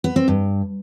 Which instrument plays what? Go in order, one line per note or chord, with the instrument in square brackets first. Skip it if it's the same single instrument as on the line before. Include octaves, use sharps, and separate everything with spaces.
[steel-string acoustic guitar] B3
C4
G2